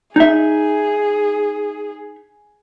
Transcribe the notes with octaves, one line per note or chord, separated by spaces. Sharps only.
D#4 G#4 E5